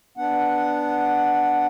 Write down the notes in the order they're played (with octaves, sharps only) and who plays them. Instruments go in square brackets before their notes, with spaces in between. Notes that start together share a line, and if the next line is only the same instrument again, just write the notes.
[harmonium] B3 D4 F#5